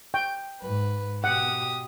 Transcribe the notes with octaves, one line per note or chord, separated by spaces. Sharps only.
G5
G#2 B4
B2 G4 F#5 D#6